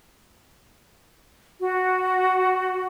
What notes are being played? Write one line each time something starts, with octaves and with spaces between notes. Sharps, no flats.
F#4